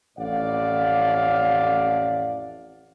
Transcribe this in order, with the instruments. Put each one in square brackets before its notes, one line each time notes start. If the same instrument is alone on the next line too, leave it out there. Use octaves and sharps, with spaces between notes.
[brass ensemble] A1 F2 A2 D5 F5 F#5